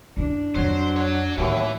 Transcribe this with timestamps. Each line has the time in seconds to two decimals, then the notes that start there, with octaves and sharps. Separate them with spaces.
0.17 F#2 D4 E4
0.56 F2 F#3 C#4 C5
0.96 C#5 F#5
1.38 D#2 A2 D3 E3 F#3 C4